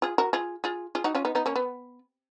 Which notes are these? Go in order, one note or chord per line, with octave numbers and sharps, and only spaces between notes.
F4 G#4
F#4 A#4
F4 G#4
F4 G#4
F4 G#4
D#4 F#4
C#4 F4
B3 D#4
B3 D#4
A#3 C#4
B3